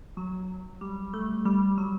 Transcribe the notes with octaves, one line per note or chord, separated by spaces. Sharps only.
F#3
G3
A3
G3
F#3